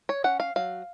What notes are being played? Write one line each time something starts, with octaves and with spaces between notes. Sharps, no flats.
C#5
C#4 F#5
F5
F#3 F5